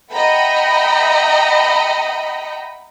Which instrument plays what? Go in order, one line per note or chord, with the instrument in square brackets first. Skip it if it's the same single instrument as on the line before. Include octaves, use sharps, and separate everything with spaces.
[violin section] D#5 E5 F#5 G5 A#5 B5